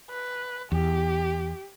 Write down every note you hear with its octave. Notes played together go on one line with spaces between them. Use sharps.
B4
E2 G4